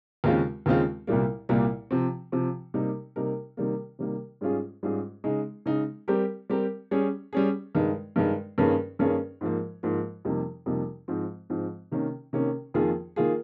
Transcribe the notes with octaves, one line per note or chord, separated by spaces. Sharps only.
D#2 C#3 G#3 C4 F4
D#2 C#3 G#3 C4 F4
C2 A#2 G3 A#3
C2 A#2 G3 A#3
C3 F3 C4
C3 F3 C4
C3 G3 A#3 D#4 A#4
C3 G3 A#3 D#4 A#4
C3 D#3 G3 A#3
C3 D#3 G3 A#3
G#2 G3 C#4 F4 G#4
G#2 G3 C#4 F4 G#4
C#3 G#3 D#4 G#4
C#3 G#3 D#4 G#4
G3 C4 G4 A#4
G3 C4 G4 A#4
G3 C#4 G#4
G3 C#4 G#4
G2 D#3 G#3
G2 D#3 G#3
G2 D#3 A#3 C#4 G#4
G2 D#3 A#3 C#4 G#4
G#2 F3 A#3
G#2 F3 A#3
F2 C3 G3 A#3 D#4
F2 C3 G3 A#3 D#4
G#2 F3 C4
G#2 F3 C4
C3 D#3 A#3 C#4
C3 D#3 A#3 C#4
F2 D#3 A#3 F4 G#4
D#3 A#3 F4 G#4